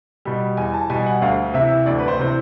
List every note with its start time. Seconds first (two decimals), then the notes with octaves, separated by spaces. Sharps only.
0.25 B2 G3
0.57 E2 G#5
0.74 A5
0.90 B2 G3 G#5
1.06 F#5
1.22 D2 F5
1.54 C3 E3 E5
1.86 D2 D5
1.99 B4
2.08 C5
2.19 C3 E3 C5